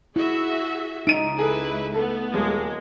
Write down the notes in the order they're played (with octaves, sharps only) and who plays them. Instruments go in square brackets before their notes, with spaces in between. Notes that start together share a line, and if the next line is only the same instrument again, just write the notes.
[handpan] E4 [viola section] F#4 G#4 E5
[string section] C#2 [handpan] D#4 [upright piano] D7 D#7
[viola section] E4 B4 [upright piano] G#4 A4
[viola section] A3 B3 [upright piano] A4
[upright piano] D#1 [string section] G#3